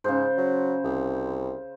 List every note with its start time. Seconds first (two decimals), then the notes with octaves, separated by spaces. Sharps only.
0.04 G#2 C#3 C5
0.37 F#3
0.84 C2